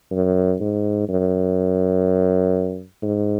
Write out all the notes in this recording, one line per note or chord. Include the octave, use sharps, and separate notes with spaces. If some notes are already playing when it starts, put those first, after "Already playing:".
F#2
G#2
F#2
G#2